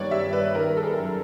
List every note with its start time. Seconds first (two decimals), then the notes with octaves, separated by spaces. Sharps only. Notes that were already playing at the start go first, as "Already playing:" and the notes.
Already playing: G2 D#3 B3 C#5 D5
0.11 G3 E5
0.33 B4
0.54 D#3 A#4
0.77 A4
0.83 G#4
0.97 F#2